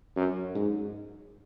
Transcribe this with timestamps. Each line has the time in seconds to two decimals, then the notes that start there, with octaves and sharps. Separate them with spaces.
0.16 F#2
0.55 G#2